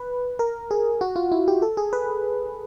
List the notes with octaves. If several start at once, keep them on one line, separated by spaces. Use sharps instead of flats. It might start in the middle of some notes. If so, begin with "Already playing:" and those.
Already playing: B4
A#4
G#4
F#4
F4
E4
G4
A4
G#4
B4